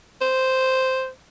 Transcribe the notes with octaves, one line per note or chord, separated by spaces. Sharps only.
C5